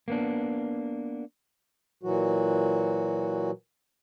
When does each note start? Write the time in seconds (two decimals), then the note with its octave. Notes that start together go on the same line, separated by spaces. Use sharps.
0.08 A#3 B3 D4
2.03 A#2 E3 F#3 F#4